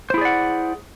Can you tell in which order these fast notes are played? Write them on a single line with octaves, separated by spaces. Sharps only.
C5 E4 G#4 D5 F#5